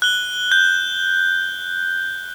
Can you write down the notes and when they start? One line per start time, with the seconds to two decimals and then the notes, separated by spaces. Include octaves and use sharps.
0.02 F#6 G7
0.52 G6